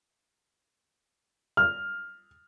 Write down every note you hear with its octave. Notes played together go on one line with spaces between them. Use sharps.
F6